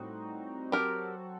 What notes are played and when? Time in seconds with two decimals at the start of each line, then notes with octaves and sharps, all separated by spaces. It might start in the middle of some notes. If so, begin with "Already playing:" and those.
Already playing: A2 G3 C4 D#4 F#4
0.72 F#3 C4 F#4 G4 A4 A#4